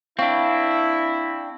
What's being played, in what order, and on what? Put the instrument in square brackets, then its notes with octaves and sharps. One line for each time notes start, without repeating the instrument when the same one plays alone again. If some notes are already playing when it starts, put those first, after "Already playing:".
[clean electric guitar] C4 D4 [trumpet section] E4 [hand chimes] F5 C#6